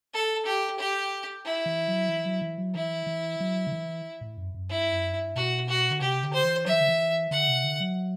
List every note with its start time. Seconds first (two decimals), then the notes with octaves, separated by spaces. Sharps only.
0.14 A4
0.46 G4
0.79 G4
1.44 E4
1.66 E3
1.88 F#3
2.09 E3
2.25 F#3
2.42 E3
2.58 F#3
2.75 E3 E4
3.07 E3
3.40 F#3
3.67 D3
3.72 E3
4.21 A2
4.37 F#2
4.54 F#2
4.70 G2 E4
4.92 F#2
5.14 G2
5.35 B2 F#4
5.69 F#4
5.91 D3
6.01 C3 G4
6.23 D3
6.33 C5
6.44 E3
6.66 F#3 E5
6.73 E3
6.80 D3
6.88 E3
7.31 D3 F#5
7.48 C3
7.64 D3
7.80 F#3